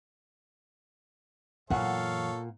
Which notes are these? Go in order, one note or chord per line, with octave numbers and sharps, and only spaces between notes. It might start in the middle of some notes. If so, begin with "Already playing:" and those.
F#2 A#2 E3 A4 C#5 F5 F#5